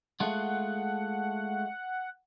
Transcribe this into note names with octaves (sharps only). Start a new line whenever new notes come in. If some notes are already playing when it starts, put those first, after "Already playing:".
G#3 A3 F4 F#5